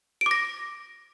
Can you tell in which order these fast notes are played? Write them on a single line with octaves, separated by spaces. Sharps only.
D7 D6 A#6